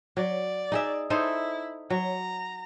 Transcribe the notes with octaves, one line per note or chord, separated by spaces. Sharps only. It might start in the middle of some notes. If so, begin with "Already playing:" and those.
F#3 D5
D#4 G#4 E5
D#4 E4 A4 C5
F#3 A#5